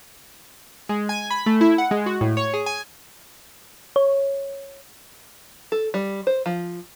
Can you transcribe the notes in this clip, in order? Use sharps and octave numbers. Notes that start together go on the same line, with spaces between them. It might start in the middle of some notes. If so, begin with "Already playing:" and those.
G#3
G#5
B5
A3
E4
F#5
G#3
F#4
A2
C#5
G#4
G#5
C#5
A4
G3
C5
F3